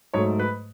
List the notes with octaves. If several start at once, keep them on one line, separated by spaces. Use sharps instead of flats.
G#2 F#3 A3 C#5
B4